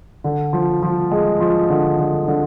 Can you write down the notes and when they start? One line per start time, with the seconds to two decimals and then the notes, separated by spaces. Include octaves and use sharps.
0.24 D3
0.53 F3
0.83 F3
1.11 G#3
1.40 F3
1.70 D3
1.99 D3
2.28 D3